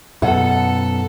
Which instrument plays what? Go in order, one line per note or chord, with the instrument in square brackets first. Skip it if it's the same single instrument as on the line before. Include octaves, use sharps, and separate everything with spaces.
[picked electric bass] F#2 B2 [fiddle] A4 [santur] F#5